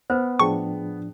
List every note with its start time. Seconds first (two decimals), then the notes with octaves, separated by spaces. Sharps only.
0.10 B3 B4 C5
0.39 A2 F3 D4 G#4 G5 A5 C#6